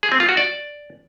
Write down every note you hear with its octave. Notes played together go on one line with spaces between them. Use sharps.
G#4
C4
F4
F#4
D5